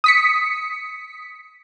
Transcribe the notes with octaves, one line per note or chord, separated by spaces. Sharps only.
D#6 B6 C#7